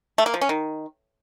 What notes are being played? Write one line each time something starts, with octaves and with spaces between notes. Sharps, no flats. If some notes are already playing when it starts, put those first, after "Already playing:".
A3
A#3
F3
C#4
D#3